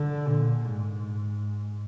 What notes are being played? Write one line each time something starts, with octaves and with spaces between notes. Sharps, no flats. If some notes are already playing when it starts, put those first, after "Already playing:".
Already playing: D3
A#2
G#2